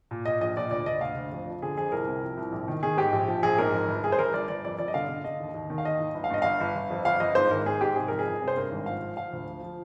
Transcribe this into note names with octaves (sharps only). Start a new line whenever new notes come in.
A#2
A#2 D#5
A#1 D#5
A#2 D5
D2 D5
D2 D#5
D2 F5
D2
F2
F3
D3 G#4
F2 G#4
C2 A#4
C3
F3
C2
A#1
D#3
D#3 G#4
G#2 G4
A#1
F3
A#1 G#4
G#2 A#4
F2
G1
G1 G#4
C5
G1 A#4
G1 D5
G1 D5
F2 D5
G1 D5
D#5
D3 F5
D3
D3 D#5
D#2
D#2
D#3
F5
D#2 D#5
D#2
G1
F5
G2 D#5
G1 F5
G1
G1
F2
G1 F5
G1 D#5
G#2 C5
G#1 A#4
G#2 G#4
G#2 G4
C3 G#4
F2 A#4
G#4
G1
C3
C5
G2 A#4
G#1
F3 F5
F3
F3 F5
D2
F3
F3